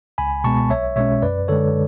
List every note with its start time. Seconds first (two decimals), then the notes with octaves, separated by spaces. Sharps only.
0.18 C#2 G#5 B5
0.44 B2 G#3 B3 A5 C#6
0.70 B1 C#5 E5
0.96 B2 G#3 C#4 C#5 E5
1.22 F#2 B4 D5
1.48 D3 G#3 A4 C#5